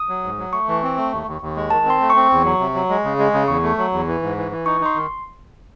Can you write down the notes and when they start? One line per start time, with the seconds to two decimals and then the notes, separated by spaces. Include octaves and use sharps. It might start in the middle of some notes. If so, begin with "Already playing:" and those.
Already playing: D#6
0.09 F#3
0.24 G#2
0.38 F#3
0.53 A3 C#6
0.68 E3
0.83 C4
0.97 A3
1.12 D#2
1.27 D#2
1.41 D#2
1.56 G#3
1.70 D#3 A5
1.86 C4 C6
2.01 A3
2.10 C#6
2.16 C4
2.30 E2
2.44 F#3
2.60 C3
2.74 F#3
2.89 G#3
3.04 C#3
3.19 G#3
3.34 C#3
3.48 E2 C#6
3.63 A3
3.78 F#3
3.92 E2
4.07 E3
4.22 G#2
4.37 E3
4.51 E3
4.66 D#4 C#6
4.81 D#4 C6
4.96 D#3